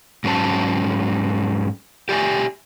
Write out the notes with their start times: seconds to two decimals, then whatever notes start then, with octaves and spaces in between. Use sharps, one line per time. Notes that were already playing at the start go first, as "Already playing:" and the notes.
0.24 G#2 F#3 C#4 C5 A5
2.09 G4 D5 E5 G#5